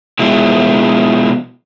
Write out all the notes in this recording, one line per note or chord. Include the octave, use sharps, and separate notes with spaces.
B2 F3 G#3 E4